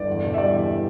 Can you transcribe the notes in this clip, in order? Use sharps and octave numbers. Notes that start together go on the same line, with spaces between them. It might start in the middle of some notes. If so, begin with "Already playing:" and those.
Already playing: G1 D5
E2
B2
E5
G3 D5
E2